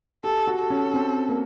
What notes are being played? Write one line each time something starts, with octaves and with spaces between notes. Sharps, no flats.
G4 A4
F#4
A4
C#4
C4
A#3